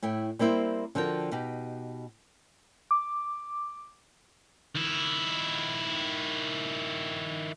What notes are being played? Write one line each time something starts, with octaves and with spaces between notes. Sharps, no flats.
A2 E4 G5
G3 A#3 C4 E4 C5
D3 F3 F#4 A#4 G5
B2 D#4 G4
D6
D#3 E4